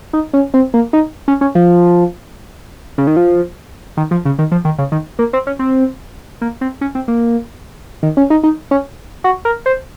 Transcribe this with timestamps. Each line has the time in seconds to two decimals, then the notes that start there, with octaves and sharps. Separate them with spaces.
0.13 D#4
0.33 C#4
0.54 C4
0.74 A#3
0.93 D#4
1.28 C#4
1.41 C#4
1.55 F3
2.98 C#3
3.07 D#3
3.16 F3
3.97 D#3
4.11 F3
4.25 C#3
4.39 D#3
4.52 F3
4.65 D#3
4.78 C#3
4.92 D#3
5.19 A#3
5.33 C4
5.47 C#4
5.59 C4
6.41 A#3
6.61 C4
6.81 C#4
6.95 C4
7.08 A#3
8.03 D#3
8.17 C#4
8.30 D#4
8.43 D#4
8.71 C#4
9.24 F#4
9.45 A#4
9.66 C5